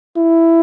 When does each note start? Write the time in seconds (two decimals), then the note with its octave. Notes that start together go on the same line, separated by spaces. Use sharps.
0.17 E4